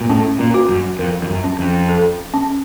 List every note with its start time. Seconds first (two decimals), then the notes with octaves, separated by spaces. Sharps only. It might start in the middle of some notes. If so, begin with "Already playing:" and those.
0.01 A#2
0.09 A2 C#4
0.39 A#2
0.54 F#4
0.69 F#2
0.99 F2 A#4
1.22 F2
1.30 F#2
1.44 C#4
1.59 F2
1.89 A4
2.34 C#4